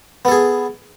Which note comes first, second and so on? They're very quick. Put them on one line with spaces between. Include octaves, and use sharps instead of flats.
B3 A4 G#4